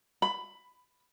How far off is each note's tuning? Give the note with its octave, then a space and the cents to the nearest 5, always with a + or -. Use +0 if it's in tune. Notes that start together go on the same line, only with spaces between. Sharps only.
B5 +15